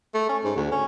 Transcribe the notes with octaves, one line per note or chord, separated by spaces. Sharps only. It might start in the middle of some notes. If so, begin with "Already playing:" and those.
A3
C#4
G#2
D2
C#4